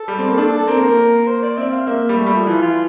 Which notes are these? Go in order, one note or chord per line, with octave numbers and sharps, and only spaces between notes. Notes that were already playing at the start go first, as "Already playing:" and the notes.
Already playing: A4
G3
C4
A#3
D4 A4
C4 A#4
A#3
A#3
C5
D5
C4 E5
F5
A#3 E5
G3
A3
G3
F3
E3 F4
F4